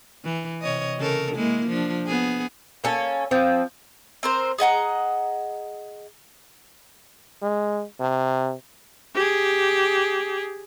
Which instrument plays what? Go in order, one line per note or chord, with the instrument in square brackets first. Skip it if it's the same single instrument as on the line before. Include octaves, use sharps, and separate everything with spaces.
[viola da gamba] E3
C3 C#5 D#5
C#3 A4 A#4
G#3 A#3 E4
F3 D4
B3 G#4
[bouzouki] A#3 C#4 A4
[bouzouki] F3 [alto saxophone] C4
[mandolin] C4 A#4 C5
G#4 D#5 F#5 A#5
[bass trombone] G#3
C3
[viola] G4 G#4